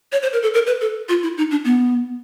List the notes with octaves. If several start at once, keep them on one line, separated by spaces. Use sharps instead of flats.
C#5
C5
A#4
A4
A#4
B4
A4
F4
E4
D#4
D4
B3